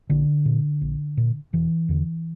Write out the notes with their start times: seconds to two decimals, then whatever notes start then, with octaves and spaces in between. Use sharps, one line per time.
0.10 A#1 D3
0.45 A#2
0.81 A#1
1.17 A#2
1.53 E1 E3
1.89 E2 D3